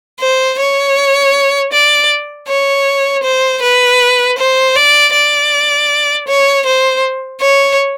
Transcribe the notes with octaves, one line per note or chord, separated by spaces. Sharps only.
C5
C#5
D5
C#5
C5
B4
C5
D5
D5
C#5
C5
C#5